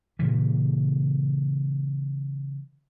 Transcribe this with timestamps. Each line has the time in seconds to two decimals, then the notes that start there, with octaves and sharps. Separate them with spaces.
0.19 A#2 C#3 E3